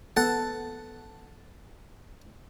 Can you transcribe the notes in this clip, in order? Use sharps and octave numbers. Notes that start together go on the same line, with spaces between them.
B3 A4 F#5 A5